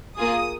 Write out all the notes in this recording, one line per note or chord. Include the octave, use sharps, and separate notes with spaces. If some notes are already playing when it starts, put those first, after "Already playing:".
A#3 F4 G#4 D#6